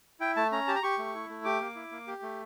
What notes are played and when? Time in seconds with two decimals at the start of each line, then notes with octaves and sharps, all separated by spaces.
0.20 E4 G5
0.36 A3 A5
0.52 C#4 A#5
0.68 G4 A5
0.75 A#5
0.83 G4 C#6
0.98 A3
1.15 E4
1.29 A3
1.45 G4 D6
1.61 A#3
1.76 E4
1.91 A#3
2.07 G4
2.22 A3